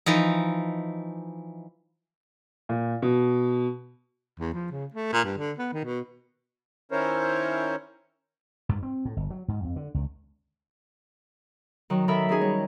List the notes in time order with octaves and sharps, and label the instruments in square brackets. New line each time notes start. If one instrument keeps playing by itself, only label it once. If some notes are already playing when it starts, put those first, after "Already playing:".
[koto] E3 F3 D#4
[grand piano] A#2
B2
[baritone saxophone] E2
F3
C#3
A3
A#2
G2
D3
B3
D#3
B2
[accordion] D#3 C#4 E4 A#4 C5 C#5
[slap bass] G2
C4
A2
G1
F#3
G#2
F2
D3
C#2
[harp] D#3 F#3
D#3 A4 A#4 E5 B5
D#3 C#4 D#4 G#4
G3 C#5